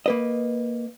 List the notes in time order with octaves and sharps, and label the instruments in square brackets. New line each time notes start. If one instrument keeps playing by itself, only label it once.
[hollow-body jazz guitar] A#3 B4 D#5